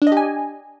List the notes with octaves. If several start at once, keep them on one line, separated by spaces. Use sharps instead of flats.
D4
D#5
G4
G#5